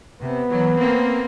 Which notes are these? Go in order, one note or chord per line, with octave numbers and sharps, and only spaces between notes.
C3 B3
E3 F#3
A#3 C4